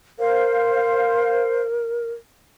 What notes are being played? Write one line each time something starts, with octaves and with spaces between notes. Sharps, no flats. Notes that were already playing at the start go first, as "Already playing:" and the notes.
A#4 C5 F5